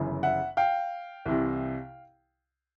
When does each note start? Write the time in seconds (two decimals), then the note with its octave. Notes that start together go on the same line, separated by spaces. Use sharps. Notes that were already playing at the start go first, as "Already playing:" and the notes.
Already playing: G1 F#2 C#3 E3
0.23 E5 F#5
0.57 F5 G5
1.25 C2 C3 E3